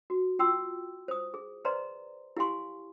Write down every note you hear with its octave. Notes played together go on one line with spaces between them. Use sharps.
F#4
F4 G5 C6 E6
C5 D#6
G#4
B4 C5 D5 D#5 A#5 C6
E4 G4 F5 G#5 C6 C#6